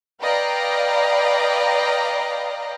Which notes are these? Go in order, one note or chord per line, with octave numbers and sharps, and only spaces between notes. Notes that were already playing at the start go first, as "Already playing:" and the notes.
B4 D5 D#5 F5 G5 A#5